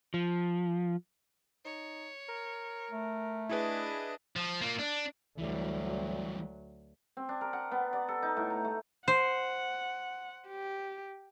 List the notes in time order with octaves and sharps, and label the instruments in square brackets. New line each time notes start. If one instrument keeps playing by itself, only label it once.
[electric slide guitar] F3
[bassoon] D#4 [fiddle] C#5
[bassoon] A#4
[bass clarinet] A3
[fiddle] D4 D#5 [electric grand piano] E4 G#4 B4
[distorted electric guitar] F3
A#3 F4
D4
[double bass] D2 F#3 [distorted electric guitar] E3 G3
[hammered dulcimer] C4
D4
A#4
F#5
B3
D5
A4
D#4
A2
A#5
A3
[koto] C5 [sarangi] F#5
[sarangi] G4